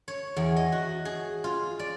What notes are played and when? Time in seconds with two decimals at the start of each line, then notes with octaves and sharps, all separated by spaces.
0.08 C#5
0.36 E2
0.56 D#5
0.72 F#4
1.05 G#4
1.44 F4
1.79 D5